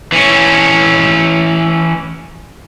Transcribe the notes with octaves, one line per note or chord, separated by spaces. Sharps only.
E3 C#4